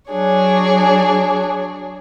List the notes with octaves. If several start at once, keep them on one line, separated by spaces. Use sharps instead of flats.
F#3 D4 G#4 C#5